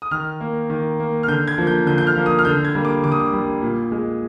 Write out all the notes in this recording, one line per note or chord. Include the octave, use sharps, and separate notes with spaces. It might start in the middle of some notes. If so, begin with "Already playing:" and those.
D#6
D#3 F6
A#3
D#3
A#3
F6
D3 G6
G#6
F3 A#3
G6
D3 G6
G6
F6
F3 A#3
D#6
F6
D3 G6
G#6
G3 A#3
D6
D3 D6
D#6
D6
G3 A#3
A#2
G#3